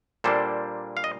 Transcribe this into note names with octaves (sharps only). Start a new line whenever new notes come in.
A#2 G3 A#3 D4 A4 C5
F5
D#5